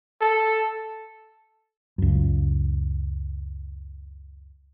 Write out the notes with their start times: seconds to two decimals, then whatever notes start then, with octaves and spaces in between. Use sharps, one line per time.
0.21 A4
1.98 C#2 F#2